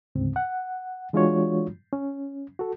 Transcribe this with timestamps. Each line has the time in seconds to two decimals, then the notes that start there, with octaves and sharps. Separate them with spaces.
0.15 D2 G#2 C#3 C4
0.36 F#5
1.13 E3 G#3 D4 F4 F#4 C#5
1.93 C#4
2.59 F#4 A4